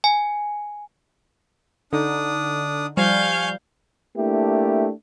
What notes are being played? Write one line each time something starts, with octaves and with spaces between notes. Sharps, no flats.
G#5
D3 D4 D#4 D#6
F3 G3 F5 G#5 C#6 F6 G6
A3 A#3 D4 E4 G4